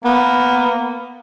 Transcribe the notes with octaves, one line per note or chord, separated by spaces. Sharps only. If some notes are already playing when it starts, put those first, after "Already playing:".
A#3 B3